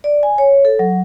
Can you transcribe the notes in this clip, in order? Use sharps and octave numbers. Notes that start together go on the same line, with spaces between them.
D5
G#5
C#5
A4
F#3